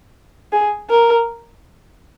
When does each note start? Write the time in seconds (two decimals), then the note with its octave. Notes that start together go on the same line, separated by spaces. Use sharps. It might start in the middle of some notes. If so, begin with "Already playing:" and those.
0.52 G#4
0.90 A#4